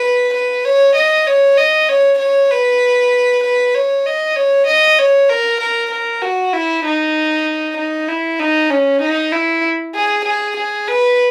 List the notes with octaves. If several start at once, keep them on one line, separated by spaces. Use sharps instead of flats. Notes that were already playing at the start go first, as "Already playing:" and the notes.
Already playing: B4
B4
C#5
D#5
C#5
D#5
C#5
C#5
B4
B4
C#5
D#5
C#5
D#5
C#5
A#4
A#4
A#4
F#4
E4
D#4
D#4
E4
D#4
C#4
D#4
E4
G#4
G#4
G#4
B4